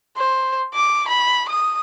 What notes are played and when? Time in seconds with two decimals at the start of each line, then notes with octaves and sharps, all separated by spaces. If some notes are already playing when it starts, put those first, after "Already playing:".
0.17 C5
0.74 D6
1.08 B5
1.49 D#6